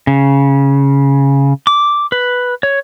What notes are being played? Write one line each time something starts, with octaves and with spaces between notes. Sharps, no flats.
C#3
D6
B4
C#5